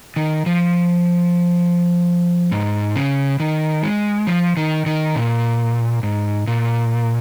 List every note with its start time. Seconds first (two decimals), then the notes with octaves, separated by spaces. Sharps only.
0.16 D#3
0.46 F3
2.52 G#2
2.96 C#3
3.40 D#3
3.83 G#3
4.27 F3
4.57 D#3
4.86 D#3
5.15 A#2
6.03 G#2
6.47 A#2